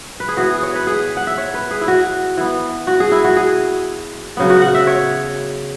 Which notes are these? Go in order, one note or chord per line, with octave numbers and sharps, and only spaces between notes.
B4
G#4
E3 B3 F#4
G#4
C#5
B4
G#4
F#5
E5
C#5
B4
G#4
E4
F#4
E3 B3
F#4
G#4
E4
F#4
G#4
C#3 F#3 B3
F#4
F#5
E5
C#5